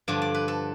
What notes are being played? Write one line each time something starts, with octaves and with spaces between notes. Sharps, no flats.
G2 D3 F3 D5
D5
B4
A4